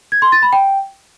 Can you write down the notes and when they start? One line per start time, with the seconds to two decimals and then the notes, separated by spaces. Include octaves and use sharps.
0.12 G#6
0.22 C6
0.32 A6
0.42 B5
0.53 G5